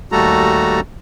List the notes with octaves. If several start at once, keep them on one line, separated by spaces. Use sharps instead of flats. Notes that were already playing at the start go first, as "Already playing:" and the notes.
D#2 G3 A3 F#4 A4 A#5